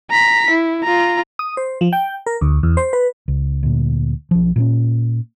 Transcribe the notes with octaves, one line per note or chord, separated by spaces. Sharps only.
A#5 B6
E4
F4 A#5
D#6
C5
F3
G5
A#4
D2
E2
C5
B4
C#2
D2 A#2
B1 F3
A#2 F#3 C#4